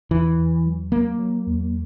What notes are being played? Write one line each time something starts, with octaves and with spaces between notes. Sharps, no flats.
E2 E3
E2
F#3
F#3 A#3
F#3
E2